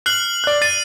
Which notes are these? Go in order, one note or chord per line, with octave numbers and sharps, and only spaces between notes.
F6 F#6 C7 F#7
D5 F#6
A6 C7 D#7